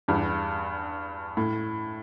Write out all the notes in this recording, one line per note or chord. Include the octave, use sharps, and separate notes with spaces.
E2 G2
A2